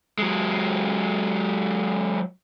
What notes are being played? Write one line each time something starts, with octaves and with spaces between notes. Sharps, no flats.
F#3 G#3